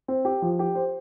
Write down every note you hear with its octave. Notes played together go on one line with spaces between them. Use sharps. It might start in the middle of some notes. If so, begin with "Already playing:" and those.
C4
G4
F3
G4
C5